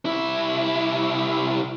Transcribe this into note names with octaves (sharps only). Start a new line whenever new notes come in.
C2 E4